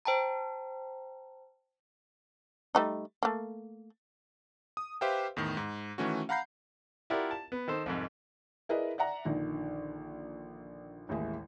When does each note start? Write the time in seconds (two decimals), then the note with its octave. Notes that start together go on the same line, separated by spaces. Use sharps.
0.05 C5 G5 A5 A#5
2.75 G3 A3 D#4
3.23 A3 A#3
4.77 D#6
5.01 G4 B4 C5 E5 F5 G5
5.37 E2 A2 D#3
5.57 G#2
5.98 D#3 E3 A3 C#4 F#4
6.29 F5 F#5 A#5 B5 G6 C7
7.10 E4 F4 G4 A#4 D5 F#5
7.31 A5
7.52 B3
7.68 D#3 A4 C5
7.86 C2 F2 G#2
8.69 E4 G#4 A#4 B4 D5 D#5
8.98 D5 E5 F#5 A#5
9.25 A#1 D3 D#3
11.09 A1 D#2 G#3 E4